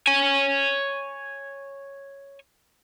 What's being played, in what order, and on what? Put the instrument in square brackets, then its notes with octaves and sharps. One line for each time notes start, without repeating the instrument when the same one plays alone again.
[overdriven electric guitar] C#5 G#5